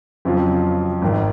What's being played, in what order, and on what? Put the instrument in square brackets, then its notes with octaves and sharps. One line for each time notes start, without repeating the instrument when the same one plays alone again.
[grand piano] F2 C#3 F#3 C4 F4
G#1 G#2 D#3